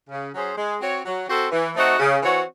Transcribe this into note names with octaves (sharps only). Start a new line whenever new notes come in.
C#3
F#3 C#4 G#4 C5
G#3
C4 F#4 C#5
F#3
C4 F#4 A4 C5
E3
A3 C4 D#4 F#4
C#3
E3 C4 F#4 C#5